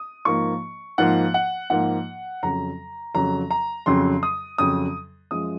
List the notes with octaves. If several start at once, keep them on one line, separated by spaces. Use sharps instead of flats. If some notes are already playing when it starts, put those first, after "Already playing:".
Already playing: D#6
G#2 F3 A#3 C#6
G#2 F3 A#3 F#5
F#5
G#2 F3 A#3 F#5
F2 C#3 F#3 A#5
F2 C#3 F#3 A#5
A#5
F2 C#3 F#3 C6
D#6
F2 C#3 F#3 D#6
F#2 F3 G#3 D#6